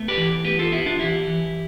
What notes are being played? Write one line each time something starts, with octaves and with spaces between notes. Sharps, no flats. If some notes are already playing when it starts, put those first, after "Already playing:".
Already playing: A3 B3
G4 B4
E3
B3 G4 B4
F4 A4
B3 E4 G4
D4 F4
E3 E4 G4
E3